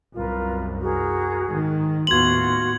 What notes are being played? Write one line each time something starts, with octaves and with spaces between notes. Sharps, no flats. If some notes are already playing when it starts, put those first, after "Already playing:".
C2 F#2 F4 A#4 B4
F#4 G#4 A#4
G#2 D#3
D#2 A2 B3 F4 F#4 C6 G#6 F#7